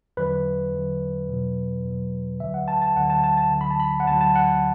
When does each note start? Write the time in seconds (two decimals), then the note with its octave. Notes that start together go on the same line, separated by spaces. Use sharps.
0.17 E2 D3 F#3 B4
0.73 E2 D3 F#3
1.29 E2 B2 F#3
1.84 E2 B2 F#3
2.40 D2 D3 F#3 E5
2.54 F#5
2.68 A5
2.82 A5
2.96 D2 D3 F#3 F#5
3.10 A5
3.24 A5
3.37 A5
3.51 D2 D3 F#3
3.61 B5
3.71 A5
3.80 B5
4.00 F#5
4.07 D2 D3 F#3 A5
4.21 A5
4.35 F#5